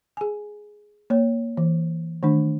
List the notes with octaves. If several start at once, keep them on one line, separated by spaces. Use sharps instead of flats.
G#4 G#5
A#3 C#5
E3
D#3 A3 D4